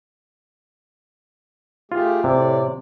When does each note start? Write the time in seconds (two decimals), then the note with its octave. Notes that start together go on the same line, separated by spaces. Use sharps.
1.92 A3 F4 G4 G#4
2.24 A2 C3 D5